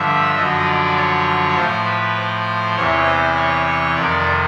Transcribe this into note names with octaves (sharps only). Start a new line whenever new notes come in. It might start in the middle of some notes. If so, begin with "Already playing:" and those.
Already playing: G2 D3 F3 E5
F#2 D3 F3 D#5
D5
C#5
A2 F3 C5
B4
C5
E2 C3 E3 C#5
C5
C#5
C#5
F2 C3 D#3 D5